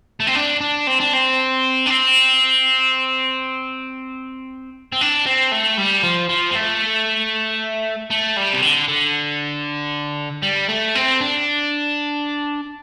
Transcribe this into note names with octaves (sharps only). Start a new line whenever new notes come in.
A3
C4
D4
D4
C4
D4
C4
D4
C4
C4
D4
C4
A3
G3
F3
F3
C4
A3
A3
G3
C3
D3
D3
G3
A3
C4
D4